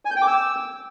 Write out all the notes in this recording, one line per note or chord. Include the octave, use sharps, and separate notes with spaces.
G#5
G6
G5
D6
E6